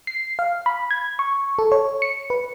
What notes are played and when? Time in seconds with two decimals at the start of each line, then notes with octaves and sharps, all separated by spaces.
0.07 C7
0.39 F5
0.66 B5
0.91 G#6
1.19 C#6
1.59 A4
1.72 C#5
2.02 C#7
2.30 B4